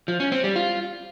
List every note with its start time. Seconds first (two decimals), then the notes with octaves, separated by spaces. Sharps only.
0.08 F3
0.20 C#4
0.32 C4
0.44 G3
0.56 F4